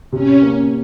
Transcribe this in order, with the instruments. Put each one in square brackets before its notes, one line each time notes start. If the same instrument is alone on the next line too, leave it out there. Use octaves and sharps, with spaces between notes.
[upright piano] C3 [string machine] C#4
[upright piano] A#3